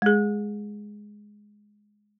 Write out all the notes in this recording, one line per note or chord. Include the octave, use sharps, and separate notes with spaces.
G#3 G#4